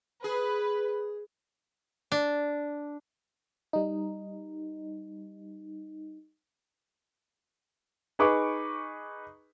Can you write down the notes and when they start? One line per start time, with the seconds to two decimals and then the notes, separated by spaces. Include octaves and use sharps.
0.24 G#4 B4
2.12 D4
3.73 G3 D#4
8.19 D#4 G#4 B4 C#6 D6